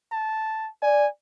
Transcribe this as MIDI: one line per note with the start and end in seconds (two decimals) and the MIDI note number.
0.12 0.69 81
0.82 1.05 74
0.82 1.07 80